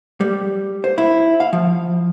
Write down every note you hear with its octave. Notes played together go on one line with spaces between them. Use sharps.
G3
C5
E4
F5
F3